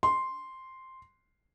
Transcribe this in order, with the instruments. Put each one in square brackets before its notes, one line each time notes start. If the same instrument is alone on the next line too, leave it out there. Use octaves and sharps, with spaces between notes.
[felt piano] C6